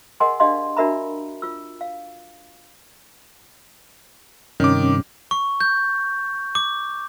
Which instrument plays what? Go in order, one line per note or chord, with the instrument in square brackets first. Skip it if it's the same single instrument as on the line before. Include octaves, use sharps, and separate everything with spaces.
[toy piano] G#4 A#4 D#5 F#5 G#5 C6
D4 G4 D5 D#5 F5 C6
D4 F#4 A#4 E5 A#5 B5
F4 E6
F5
[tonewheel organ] G2 C3 [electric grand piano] D#3 D6 [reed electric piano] C#4
[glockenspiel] C#6
G6
D6